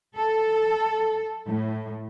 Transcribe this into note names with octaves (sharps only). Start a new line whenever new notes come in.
A4
A2